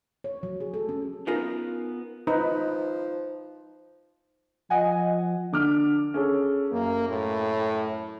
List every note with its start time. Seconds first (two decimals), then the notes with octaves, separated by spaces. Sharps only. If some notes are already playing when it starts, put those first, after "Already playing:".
0.24 C#5
0.43 F#3
0.60 G#4
0.74 A4
0.89 C#4
1.27 B3 C#4 D#4 F4 A#4
2.27 F3 D#4 B4
4.70 F3 D#5 F#5 G#5
5.53 D3 D6 F6
6.14 C#4 G#4 A4
6.72 F#2 A#3
7.09 A2